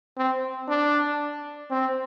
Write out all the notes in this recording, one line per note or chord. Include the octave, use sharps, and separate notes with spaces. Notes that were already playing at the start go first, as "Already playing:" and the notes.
C4
D4
C4